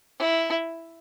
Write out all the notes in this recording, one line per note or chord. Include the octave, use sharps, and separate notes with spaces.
E4